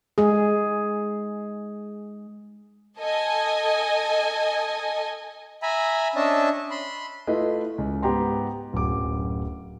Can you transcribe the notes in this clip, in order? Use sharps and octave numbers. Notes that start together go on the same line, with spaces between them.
G#3 G#4
A4 D#5 G#5
E5 G#5 A#5 B5
C#4 D4 D#5 E5 A5
B5 C6
A3 E4 F4 B4 D#5
C#2
G#2 B3 G4 G5 A#5 C6
D1 F#2 D6